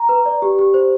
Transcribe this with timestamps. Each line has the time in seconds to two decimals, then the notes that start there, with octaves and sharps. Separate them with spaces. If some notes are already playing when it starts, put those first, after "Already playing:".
Already playing: A#5
0.09 B4
0.26 D5
0.42 G4
0.59 G4
0.74 C5